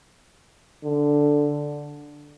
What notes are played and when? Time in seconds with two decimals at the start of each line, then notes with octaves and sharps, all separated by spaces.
0.84 D3